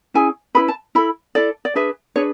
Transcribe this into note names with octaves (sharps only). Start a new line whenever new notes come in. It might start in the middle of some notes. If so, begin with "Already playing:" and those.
C#4 E4 G#4 G#5
C#4 E4 G#4 B4 B5
A5
E4 A4 B5
E4 A4 D5
D5
D4 G#4 B4 E5
D4 G#4 B4 C#5